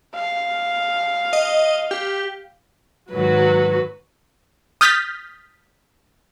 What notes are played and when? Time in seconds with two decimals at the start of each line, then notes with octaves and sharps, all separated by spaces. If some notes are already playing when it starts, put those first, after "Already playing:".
0.15 F5
1.33 D#5
1.91 G4
3.12 G#2 D#3 F#3 F#4 B4
4.81 D#6 F6 G6 A6 B6